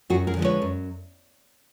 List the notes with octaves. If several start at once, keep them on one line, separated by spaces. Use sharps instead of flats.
F#2 F#4 G#4
G#4 A#4
D3 F3 G#3 B3
B4 C#5
F#2